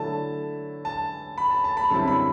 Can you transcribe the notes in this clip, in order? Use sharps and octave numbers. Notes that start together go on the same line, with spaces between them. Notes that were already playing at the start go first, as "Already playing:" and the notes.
Already playing: D3 F#3 A3 E4 A5
A5
B5
A5
A5
B5
F#2 D3 G3 C4 E4 A5
B5